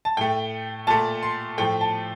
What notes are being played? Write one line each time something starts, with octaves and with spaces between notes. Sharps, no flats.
A5
A2 A3 G5
A#2 A3 A5
C6
A2 F3 A3 G5
A5